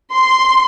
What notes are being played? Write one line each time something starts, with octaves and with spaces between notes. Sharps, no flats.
C6